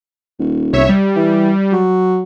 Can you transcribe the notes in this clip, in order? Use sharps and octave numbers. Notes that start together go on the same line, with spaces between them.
D#1
C2 C#5 E5
G3
E3
F#3